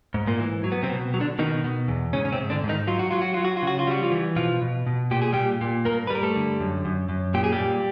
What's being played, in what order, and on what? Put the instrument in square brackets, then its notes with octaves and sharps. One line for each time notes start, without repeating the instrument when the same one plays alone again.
[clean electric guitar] G#2
A#2 A#3
E3
F#3
B3
C3 C4
B2
F#3
D3 D4
B2 D#3 D#4
B2
E2
G#2 C#3 C#4
C#4
C3 C4
G#2
D3 D4
G#2
D#3 D#4
F#3 F4
F#4
F#3 F4
F#4
F#3 F4
F#4
F4
C#3 F#4
F4
G3 F#4
F3 F4
E3
B2 F3 F4
B2
B2
A#2 G4
G#4
A#2 G3 G4
A#2
G2 A#3 A#4
B4
G3 A#4
A3 A4
D3
F#2
F#2
F#2
A#2 G4
G#4
G3 G4
A#2